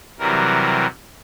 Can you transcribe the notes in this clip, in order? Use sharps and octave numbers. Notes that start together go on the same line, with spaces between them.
C3 E3 F#3 G3 A#4